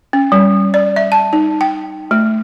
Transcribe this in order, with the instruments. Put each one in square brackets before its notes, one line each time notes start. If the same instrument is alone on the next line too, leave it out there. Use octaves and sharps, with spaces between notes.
[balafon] C#4
G3
D5
E5
A5
D#4
G5
A3